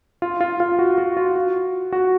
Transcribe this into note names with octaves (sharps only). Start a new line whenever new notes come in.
F4
F4
F4
F#4
F#4
F4
F#4
F#4